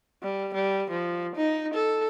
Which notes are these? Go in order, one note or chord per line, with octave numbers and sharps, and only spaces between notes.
G3
G3
F3
D#4
A4